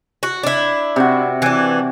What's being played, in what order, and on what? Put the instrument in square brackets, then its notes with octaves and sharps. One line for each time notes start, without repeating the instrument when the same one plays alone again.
[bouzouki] F#4
D4 E4
[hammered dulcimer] C3 F#4
[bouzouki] E3 D4